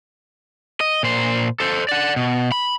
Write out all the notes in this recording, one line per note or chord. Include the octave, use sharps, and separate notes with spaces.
D#5
A#2 C5
A4 C5
D5 F#5
B2
B5